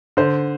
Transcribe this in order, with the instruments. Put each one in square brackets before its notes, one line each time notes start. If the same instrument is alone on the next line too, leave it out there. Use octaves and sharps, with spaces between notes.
[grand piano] D3 C5